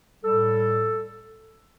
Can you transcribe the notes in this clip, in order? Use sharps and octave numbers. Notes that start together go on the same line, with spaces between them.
A2 G3 A4